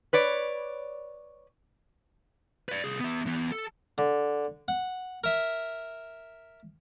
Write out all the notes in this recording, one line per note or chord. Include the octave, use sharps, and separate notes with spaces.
B4 C#5 D5
B4 D5
C2 G#4
B3 E5
E3 B3
A4
D3
F#5
A#4 E5